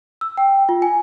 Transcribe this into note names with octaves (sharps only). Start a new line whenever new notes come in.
E6
G5
F4
G#5